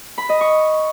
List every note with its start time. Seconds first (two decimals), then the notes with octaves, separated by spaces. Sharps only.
0.18 B5
0.29 D#5
0.41 C#6